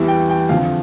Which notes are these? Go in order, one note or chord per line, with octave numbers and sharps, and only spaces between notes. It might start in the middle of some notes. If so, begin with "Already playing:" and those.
Already playing: E2 E3 G3
G5
G5
F2 D3 F3 F5